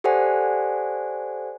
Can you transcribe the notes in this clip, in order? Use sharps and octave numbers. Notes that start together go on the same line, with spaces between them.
G4 A4 C5 D5 F#5 G#5